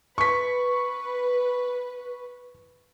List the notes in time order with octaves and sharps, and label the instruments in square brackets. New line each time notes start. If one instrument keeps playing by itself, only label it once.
[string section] B4 [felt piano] C#6 B6